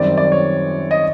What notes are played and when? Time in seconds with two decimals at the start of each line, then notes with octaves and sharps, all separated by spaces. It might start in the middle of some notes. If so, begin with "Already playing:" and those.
Already playing: F#2 D#3 G3 C4 D5
0.17 D5
0.32 C#5
0.91 D#5